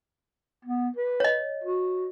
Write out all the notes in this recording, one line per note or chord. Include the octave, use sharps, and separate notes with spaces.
B3
B4
C#5 D#5
F#4